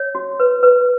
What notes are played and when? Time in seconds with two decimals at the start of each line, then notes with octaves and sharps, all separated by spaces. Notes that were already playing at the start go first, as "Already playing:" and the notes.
Already playing: C#5
0.15 F#4
0.40 B4
0.63 B4